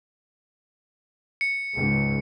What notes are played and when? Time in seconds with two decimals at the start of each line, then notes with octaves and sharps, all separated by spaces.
1.41 C#7
1.75 C#2 G#2